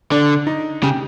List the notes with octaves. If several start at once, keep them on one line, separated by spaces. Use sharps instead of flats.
D3 D4
D#4
C#3 G4